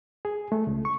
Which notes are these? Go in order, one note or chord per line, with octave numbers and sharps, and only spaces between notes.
G#4
A3
C#2
C#6